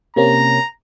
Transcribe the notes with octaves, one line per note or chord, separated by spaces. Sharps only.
C3 A#3 C#4 A#5